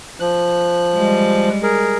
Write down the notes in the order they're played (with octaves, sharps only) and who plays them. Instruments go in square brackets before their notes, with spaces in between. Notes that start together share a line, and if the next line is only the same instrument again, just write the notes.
[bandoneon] F3 F#6
[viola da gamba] G3 G#3
[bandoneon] G#4 A#4